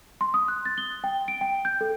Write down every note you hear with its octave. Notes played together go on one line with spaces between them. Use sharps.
C6
D#6
F#6
A6
G7
G5
D7
G5
G6
A4